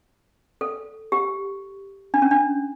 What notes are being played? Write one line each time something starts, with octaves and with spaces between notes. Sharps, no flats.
A4
G4
D4
C#4
D4